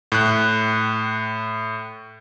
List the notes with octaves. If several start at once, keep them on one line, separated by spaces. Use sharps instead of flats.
A2 F#6